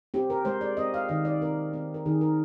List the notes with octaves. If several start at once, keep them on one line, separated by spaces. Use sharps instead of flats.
C4 G4
A#4
G#3 C5
D5
C4 D#5
F5
D#3 D#5
D5
C4 A#4
C4
A#4
D#3 G#4
A#4